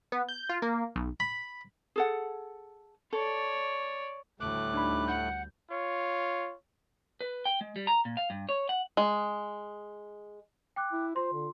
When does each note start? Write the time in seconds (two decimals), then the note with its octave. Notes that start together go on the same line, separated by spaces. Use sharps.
0.12 B3
0.29 G6
0.49 F4
0.62 A#3
0.96 B1
1.20 B5
1.96 G#4 A4 F#5
3.13 A4 C#5 D5
4.41 D2 A2 G3 A3 D6 F#6
4.74 D4 D#4 B5
5.08 F#5 G6
5.71 F4 C#5
7.21 B4
7.45 G5
7.61 G#3
7.76 G3
7.87 A#5
8.05 A#2
8.17 F5
8.30 G2
8.49 C#5
8.69 F#5
8.97 G#3
10.76 G5 D6 F#6
10.92 E4
11.16 F4 C5 C6
11.33 D3